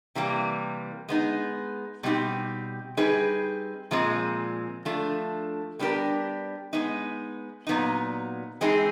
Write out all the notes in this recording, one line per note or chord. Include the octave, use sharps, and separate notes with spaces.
C3 E3 G3 A#3
G#3 B3 D#4
B2 G3 C4 D#4 G4
G3 C4 D#4 G#4 B4
A#2 F3 G#3 C4
F3 A3 D4
G3 B3 D4 G4 A#4
G#3 B3 D#4
A#2 F#3 B3 D#4
E3 G#3 C4 D#4 G#4